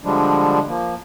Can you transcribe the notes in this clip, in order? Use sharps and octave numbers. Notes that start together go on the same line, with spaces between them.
D3 F3 G3 G#3 D4
F3 A#3